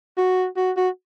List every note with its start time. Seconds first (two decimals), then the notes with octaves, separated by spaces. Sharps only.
0.18 F#4
0.57 F#4
0.77 F#4